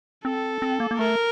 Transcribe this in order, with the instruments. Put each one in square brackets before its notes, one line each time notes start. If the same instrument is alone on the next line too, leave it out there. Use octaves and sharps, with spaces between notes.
[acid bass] C4 [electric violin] A4
[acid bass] C4
A#3
A#3
[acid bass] A3 [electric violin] A#4